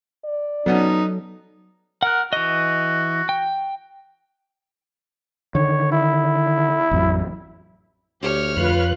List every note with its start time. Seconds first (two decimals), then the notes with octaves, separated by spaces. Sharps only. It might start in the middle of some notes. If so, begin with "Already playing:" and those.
0.24 D5
0.66 B2 F#3 B3 C#4 D#4 A4
2.03 A#4 F#5 F#6
2.33 E3 F#4 D#5
3.29 G5
5.55 D3 D#3 C#5
5.92 E4
6.91 A1 F2 F#3
8.22 D2 G4 C#5 F6
8.57 F2 F4 B4 F#6